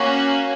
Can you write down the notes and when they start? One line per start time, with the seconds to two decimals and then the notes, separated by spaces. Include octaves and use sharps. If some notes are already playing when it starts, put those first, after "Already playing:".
Already playing: A#3 C#4 F#4